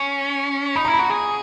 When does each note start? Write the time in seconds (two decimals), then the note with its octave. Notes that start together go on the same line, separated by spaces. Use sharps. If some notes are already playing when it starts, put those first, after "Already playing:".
Already playing: C#4 C#6
0.75 D#4 B5
0.85 E4 A#5
0.93 B5
0.99 F#4
1.10 G#4